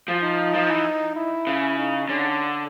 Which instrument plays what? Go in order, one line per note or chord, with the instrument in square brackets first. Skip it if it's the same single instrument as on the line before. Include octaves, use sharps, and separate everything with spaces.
[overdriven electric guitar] F3
[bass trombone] D#4
[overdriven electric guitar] F3
E3
[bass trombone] E4
[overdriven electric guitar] C#3
[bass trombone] D#4
[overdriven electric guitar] D3 [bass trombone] C#4